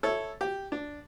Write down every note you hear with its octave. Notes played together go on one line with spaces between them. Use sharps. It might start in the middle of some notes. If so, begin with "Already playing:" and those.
E4 A4 C#5
G4
D4